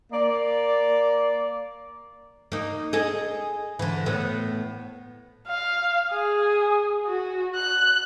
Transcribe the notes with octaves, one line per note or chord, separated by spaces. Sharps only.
A#3 D5
A#3 D#4
G#4 A4 D#5
D3 E3
A2 B3
F5
G#4
F#4
F#6